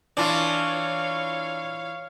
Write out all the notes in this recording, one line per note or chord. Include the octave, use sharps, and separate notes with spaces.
E3 D4 F4 C#5 F5